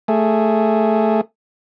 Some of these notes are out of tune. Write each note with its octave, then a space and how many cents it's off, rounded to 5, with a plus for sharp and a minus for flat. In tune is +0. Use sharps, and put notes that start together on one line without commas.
A3 +0 G#4 +0